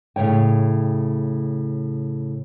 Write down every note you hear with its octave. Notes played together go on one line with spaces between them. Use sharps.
A2 C#3 C#5 G5